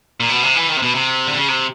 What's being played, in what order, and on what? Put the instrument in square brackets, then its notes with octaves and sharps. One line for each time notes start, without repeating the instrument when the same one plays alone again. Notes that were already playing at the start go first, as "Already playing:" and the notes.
[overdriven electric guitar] A#2
B2
C3
E3
D#3
C3
B2
C3
D3
C#3
C3